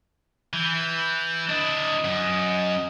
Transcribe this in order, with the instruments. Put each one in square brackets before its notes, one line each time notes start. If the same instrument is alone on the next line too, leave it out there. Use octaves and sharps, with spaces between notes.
[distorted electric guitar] E3 [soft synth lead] G6
[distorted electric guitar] D4 E4 [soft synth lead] D#5
[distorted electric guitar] F#2